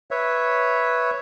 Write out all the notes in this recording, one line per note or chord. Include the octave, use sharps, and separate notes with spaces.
B4 C#5 E5